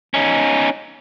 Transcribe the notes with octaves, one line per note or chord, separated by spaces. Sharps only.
C#4 D#4